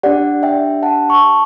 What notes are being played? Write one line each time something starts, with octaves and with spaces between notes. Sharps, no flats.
D4 G4 D5 F#5
E5 G5
F#5 A5
A5 C#6